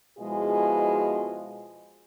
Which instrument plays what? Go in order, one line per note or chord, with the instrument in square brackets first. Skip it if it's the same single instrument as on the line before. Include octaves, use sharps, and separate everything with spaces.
[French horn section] B2 F3 G#3 E4 F4 G#4